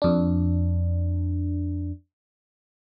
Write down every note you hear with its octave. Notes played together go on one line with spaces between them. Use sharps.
F2 D4